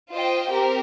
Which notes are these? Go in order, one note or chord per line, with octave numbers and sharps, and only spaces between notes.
F4 C5 D#5 G5
C4 G4 A#4